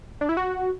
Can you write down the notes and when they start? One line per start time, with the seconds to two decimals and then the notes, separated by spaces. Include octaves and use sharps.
0.21 D4
0.29 E4
0.37 F#4